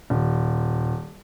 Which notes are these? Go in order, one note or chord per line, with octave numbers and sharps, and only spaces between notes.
D#1